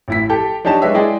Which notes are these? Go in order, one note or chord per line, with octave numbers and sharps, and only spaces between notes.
A1 E4 B6
G4 A4 G5
D4 D#4 G4 C#5 A5 E7
G#3 D4 B4 C#5 D#5 E5
G#3 E4 G#4 D5 D#5 G5